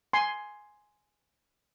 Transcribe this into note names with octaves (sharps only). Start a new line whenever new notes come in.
G#5 C6